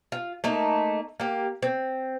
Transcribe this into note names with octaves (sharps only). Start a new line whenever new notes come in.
F4
A3 A#3 D#4
A#3 G4
C4